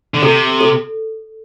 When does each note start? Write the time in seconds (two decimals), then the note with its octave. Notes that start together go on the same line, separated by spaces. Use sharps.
0.14 D3
0.22 C3 A4
0.61 A4